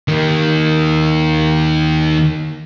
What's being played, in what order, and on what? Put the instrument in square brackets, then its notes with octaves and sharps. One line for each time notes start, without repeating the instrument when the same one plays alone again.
[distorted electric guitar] D#2 D#3